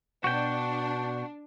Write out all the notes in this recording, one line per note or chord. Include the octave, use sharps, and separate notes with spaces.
B2 D4 F#4 G5